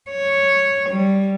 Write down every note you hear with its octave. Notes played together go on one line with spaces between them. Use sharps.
C#5
G3